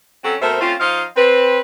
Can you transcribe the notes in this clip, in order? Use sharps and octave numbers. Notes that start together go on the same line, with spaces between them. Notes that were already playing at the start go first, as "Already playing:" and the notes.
F#3 C4 C#4 F#4 A4
B2 A3 C4 A#4 C5 E5
A3 C4 C#4 F4
F3 D#4 D#5 F5
C4 B4